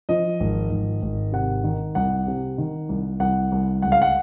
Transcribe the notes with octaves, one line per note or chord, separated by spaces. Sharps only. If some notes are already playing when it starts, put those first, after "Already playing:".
F3 D#5
G#1
G#1
G#1
C3 F#5
D#3
C2 F#5
C3
D#3
C2
C2 F#5
C2
C#2 F#5
F5
F#5